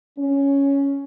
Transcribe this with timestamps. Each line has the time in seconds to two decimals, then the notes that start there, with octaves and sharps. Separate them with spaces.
0.18 C#4